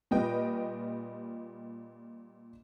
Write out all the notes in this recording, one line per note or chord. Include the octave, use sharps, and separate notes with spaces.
A#2 G3 F4 B4 D#5 G5